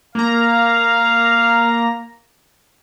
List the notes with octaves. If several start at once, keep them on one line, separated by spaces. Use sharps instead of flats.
A#3 F5 A#5